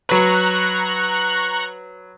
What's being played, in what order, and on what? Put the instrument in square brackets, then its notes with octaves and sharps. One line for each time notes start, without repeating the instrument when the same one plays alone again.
[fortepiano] F#3 B4 [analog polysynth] A#5 C#6 F#6